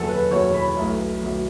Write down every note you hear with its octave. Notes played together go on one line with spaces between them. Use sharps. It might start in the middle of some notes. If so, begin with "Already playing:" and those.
Already playing: F#1 E2 B2 F#3 A4
B4
F#1 E2 B2 F#3 C#5
B5
B1 B2 A3
B1 B2 A3